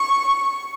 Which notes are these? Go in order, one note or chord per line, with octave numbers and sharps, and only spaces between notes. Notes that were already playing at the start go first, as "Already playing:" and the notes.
Already playing: C#6